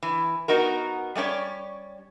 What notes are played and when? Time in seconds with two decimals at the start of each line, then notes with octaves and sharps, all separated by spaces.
0.03 E3
0.48 B3 D#4 F#4 A#4
1.15 G3 A3 C#4 C#5 D5